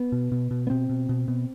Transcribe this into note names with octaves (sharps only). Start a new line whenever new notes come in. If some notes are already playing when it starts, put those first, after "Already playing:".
Already playing: B3
B2
B2
B2
B3
B2 C4
B2
B2
B2